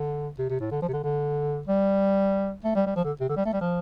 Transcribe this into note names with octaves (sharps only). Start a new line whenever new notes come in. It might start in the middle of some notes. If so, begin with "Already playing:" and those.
Already playing: D3
C3
C3
A2
D3
F3
C3
D3
D3
G3
A3
G3
G3
F3
D3
C3
D3
G3
A3
G3
F3